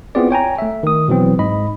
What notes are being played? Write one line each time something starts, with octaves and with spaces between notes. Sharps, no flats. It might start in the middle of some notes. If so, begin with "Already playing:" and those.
B3 C4 E4 F4 G#4 D5
C#5 G5 G#5 A#5
A3 E5
D#3 D#6
B2 E3 F#3 C4
G#2 D#5 B5